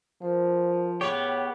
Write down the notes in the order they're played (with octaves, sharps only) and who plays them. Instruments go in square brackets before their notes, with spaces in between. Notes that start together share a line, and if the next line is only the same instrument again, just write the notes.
[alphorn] F3 [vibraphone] A#4 C5
[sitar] A2 C#5 [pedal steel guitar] B3 G4 [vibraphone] G#4